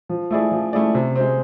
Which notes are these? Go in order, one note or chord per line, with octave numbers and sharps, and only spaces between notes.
F3
A3 E4 G#4 D5
F3
A3 E4 G#4 D5
C3
G#3 C4